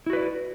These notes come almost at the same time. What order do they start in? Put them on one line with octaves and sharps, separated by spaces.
E4 F#4 B4 D5